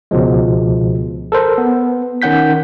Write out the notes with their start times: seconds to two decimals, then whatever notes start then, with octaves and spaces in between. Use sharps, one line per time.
0.11 C#2 B2 F3 G#3
1.32 A4 A#4 C5
1.58 B3
2.22 D#3 C#4 F#5 G6 B6